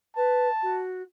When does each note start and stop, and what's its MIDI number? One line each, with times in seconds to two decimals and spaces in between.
0.16 0.47 71
0.16 0.82 81
0.62 1.02 66